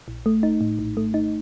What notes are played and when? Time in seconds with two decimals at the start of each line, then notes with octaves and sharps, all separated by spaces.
0.08 A#1
0.26 A3
0.43 D#4
0.61 A2
0.79 A#1
0.97 A3
1.14 D#4